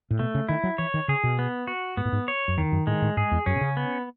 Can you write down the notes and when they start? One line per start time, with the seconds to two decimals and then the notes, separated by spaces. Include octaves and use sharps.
0.11 A2
0.19 B2 A3
0.35 C#3
0.49 D#3 E4
0.64 F#3
0.78 E3 C#5
0.94 D#3
1.08 C#3 G#4
1.24 B2
1.39 B3
1.67 F#4
1.97 G#2 B3
2.05 A2
2.12 G#2
2.28 C#5
2.48 F#2
2.57 E2 D#3
2.72 F#2
2.87 A2 G#3
3.02 A2
3.17 G#2 G#4
3.31 E2
3.46 F#2 C#4
3.56 B2
3.61 C#3
3.77 B3